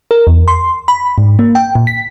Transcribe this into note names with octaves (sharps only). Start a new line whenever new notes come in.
A#4
E2
C6
B5
G#2
A#3
G5
A#2
B6